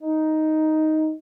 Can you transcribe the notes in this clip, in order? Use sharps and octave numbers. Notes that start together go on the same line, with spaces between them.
D#4